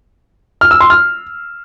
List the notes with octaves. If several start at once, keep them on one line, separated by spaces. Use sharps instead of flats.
F6
E6
C6
F6